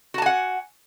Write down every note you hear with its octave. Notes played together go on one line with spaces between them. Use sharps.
F#4 F#5 G#5 A5